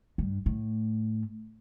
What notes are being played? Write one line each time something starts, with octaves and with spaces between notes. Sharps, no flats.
G2
A2